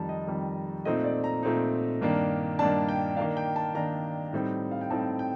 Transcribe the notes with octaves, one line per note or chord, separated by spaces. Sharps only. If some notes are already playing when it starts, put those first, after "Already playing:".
Already playing: F2 D#3 G3 A5
D#5
F2 D#3 G3
A#2 A3 C4 D#4 D#5
D5
A#5
A#2 A3 C4 D#4
G2 D#3 A#3 D4
G2 D#3 A#3 D4 A5
G5
D#3 A#3 D4 F5
G5
A5
D#3 A#3 D4 A#5
A2 G3 C4 D#4
F5
G5
A2 G3 C4 D#4 A5
G5